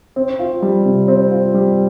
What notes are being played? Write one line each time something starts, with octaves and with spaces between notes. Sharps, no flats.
C4
F4
G3
C3
C4
F4
G3